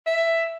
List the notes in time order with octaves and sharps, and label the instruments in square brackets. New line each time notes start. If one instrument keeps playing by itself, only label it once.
[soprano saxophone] E5